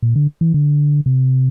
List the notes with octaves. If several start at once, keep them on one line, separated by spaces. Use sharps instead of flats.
A#2
D3
E3
D3
C3